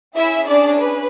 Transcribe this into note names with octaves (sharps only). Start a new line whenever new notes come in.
C#4 E4 G#4 E5
D4 D5
B4